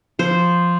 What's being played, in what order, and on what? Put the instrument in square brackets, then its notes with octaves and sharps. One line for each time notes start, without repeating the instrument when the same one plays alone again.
[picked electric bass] F3 [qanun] C5